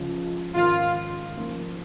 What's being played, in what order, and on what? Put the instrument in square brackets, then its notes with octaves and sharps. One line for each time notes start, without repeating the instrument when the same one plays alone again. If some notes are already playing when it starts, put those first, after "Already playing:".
Already playing: [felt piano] C#2 C#3 F3 C#4 F4
[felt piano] G#2 D#3 C#4 A#4 [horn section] F4
[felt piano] C#3 F3 A#3 D#4 A#4